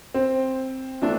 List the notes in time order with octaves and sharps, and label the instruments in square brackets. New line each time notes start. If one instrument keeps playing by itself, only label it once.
[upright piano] C4
[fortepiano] E3 A3 D4